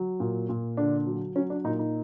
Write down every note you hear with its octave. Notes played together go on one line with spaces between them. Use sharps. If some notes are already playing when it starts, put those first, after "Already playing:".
Already playing: F#3
A#2
A#2
D3 D4
F#3
F#3 C#4
D4
A#2 D#4
D#4